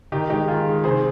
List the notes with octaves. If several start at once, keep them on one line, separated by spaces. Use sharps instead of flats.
D#3 D#4 G4
G#3 D#4 G4
D#3 F4 G#4
G#3
C3 G#4 C5